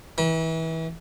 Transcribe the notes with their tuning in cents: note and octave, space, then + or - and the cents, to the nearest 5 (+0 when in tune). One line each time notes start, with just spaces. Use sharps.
E3 -25 B5 -45